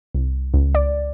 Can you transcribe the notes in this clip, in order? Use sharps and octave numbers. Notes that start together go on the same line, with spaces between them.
C2
C#2
D5